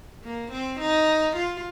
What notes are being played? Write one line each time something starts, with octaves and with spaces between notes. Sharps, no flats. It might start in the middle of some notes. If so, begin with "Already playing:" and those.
A#3
C4
D#4
F4